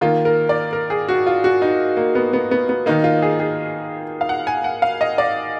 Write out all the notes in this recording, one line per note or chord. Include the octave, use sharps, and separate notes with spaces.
D#3 A#3 F4
A#4
D5
A#4
G#4
F#4
F4
F#4
D#4
A#3
B3
B3
B3
B3
D#3 A#3 D#4
F4
G#4
G#4
F5
F#5
G#5
F#5
F5
D#5
D5